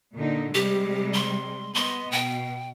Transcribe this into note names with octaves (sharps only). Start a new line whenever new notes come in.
A#2 D3 D#4
C3 G3 G#3 G4
C6
B3 D#5 C6
B2 G5